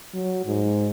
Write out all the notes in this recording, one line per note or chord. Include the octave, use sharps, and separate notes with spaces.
F#3
G#2